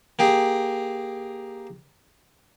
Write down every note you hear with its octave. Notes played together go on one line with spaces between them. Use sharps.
A#3 G4 G#4